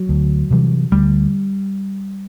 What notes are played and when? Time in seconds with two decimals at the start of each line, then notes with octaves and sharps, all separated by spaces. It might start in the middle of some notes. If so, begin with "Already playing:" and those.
Already playing: F#3
0.09 D2
0.51 C3 E3 G3
0.92 D2 G3